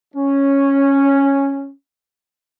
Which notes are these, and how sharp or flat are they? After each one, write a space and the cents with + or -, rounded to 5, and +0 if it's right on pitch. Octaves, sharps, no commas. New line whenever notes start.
C#4 -5